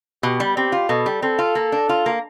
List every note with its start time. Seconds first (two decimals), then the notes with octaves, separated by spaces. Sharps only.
0.23 B2 G4
0.40 G3
0.56 C4 G4
0.72 F4
0.89 B2 A4
1.06 G3
1.22 C4 A4
1.39 F4
1.55 A#3
1.72 D4
1.89 F4
2.06 A#3